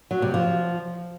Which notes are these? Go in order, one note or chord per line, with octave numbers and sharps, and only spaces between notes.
F#3
C3
F3